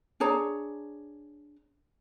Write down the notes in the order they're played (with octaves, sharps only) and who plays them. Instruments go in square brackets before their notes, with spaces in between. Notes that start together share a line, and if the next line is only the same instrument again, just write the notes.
[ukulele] D4 G#4 C#5 A#5